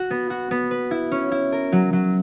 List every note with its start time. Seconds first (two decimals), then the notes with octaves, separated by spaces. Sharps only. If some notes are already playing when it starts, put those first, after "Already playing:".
Already playing: F#4
0.11 B3
0.30 F#4
0.51 B3
0.71 B4
0.91 E4
1.11 C#4
1.32 E4
1.52 A#4
1.72 F#3
1.93 F#3